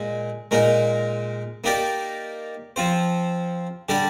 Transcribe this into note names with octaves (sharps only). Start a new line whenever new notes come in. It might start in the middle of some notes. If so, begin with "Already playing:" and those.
Already playing: A#2 G#3 D#4 G#4
A#2 G#3 D#4 A#4
A#3 D#4 G4 A#4 D5
F3 C4 F4 C5
D3 G3 D4 G4 D5